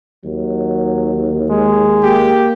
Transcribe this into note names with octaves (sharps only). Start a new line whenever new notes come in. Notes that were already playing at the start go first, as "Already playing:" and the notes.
D#2 F#3
G#3
A#3 G4